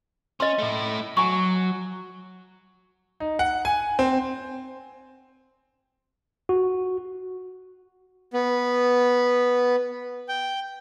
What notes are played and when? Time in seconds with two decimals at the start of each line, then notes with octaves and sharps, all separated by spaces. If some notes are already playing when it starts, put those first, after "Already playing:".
0.40 C#4 D#5 C6
0.59 A3 E4
1.17 F#3 G#5 C#6
3.20 D#4
3.39 F#5
3.65 G#5
3.99 C4
6.49 F#4
8.33 B3
10.28 G5